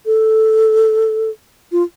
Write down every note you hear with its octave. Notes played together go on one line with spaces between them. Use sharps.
A4
F4